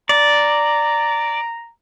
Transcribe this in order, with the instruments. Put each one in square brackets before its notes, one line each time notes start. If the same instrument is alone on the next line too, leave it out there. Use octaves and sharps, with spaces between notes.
[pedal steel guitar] D5 [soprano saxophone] A#5